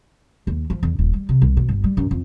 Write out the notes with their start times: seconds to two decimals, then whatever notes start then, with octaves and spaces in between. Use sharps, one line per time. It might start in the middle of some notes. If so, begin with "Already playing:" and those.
0.47 D#2
0.70 F3
0.83 E2
0.99 D#1
1.13 G3
1.29 C3
1.42 C2
1.57 B2
1.69 G1
1.84 G3
1.97 F#2
2.11 F2